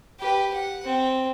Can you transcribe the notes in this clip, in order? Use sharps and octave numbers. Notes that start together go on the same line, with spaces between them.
G4 B4
F#5
C4